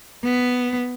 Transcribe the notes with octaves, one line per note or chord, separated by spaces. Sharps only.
B3